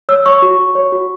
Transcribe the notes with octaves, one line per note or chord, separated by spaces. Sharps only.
C#5 E6
C#5 C#6
F#4
F#4
C#5
F#4